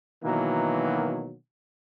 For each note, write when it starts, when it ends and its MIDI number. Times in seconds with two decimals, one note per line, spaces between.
0.24 1.34 47
0.24 1.34 51
0.24 1.34 52
0.24 1.34 54
0.24 1.34 58